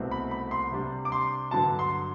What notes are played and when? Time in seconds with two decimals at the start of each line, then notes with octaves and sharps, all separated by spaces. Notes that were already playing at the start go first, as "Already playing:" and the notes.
Already playing: C2 B2 A3 C4
0.11 B5
0.31 B5
0.51 C6
0.71 C3 G3 D4
1.05 D6
1.12 C6
1.51 G2 D3 F#3 A5
1.79 C6